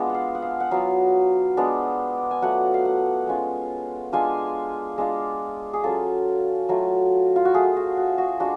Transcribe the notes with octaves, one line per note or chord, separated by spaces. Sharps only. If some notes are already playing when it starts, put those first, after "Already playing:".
Already playing: G#3 B3 D4 F4
F5 F#5
F#5
F5
F#5
F#3 B3 F4 F5
G#3 B3 D4 D5
G#5
F#3 A3 F4 F#5
F5
F#5
G#3 C#4 F4
G#3 D4 F4 G#5
G#3 D4 F4
G#4
F#3 C#4 F4 A4
F#3 A3 F4
F4
F#4
A3 F4 G#4
F#4
F#4
F#4
G#3 D4 F4 F#4